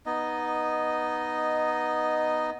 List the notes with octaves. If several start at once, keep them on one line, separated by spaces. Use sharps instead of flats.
B3 D#4 D#5